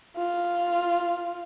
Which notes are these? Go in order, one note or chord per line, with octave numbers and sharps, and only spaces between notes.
F4